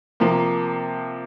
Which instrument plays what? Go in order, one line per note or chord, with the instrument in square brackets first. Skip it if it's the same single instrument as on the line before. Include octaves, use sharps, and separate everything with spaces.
[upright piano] C3 F3 A#3